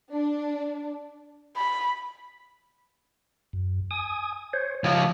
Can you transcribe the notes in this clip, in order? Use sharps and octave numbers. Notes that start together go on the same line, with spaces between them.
D4
B5
F#2
G#5 D#6
C5 C#5
C#2 F3 C#5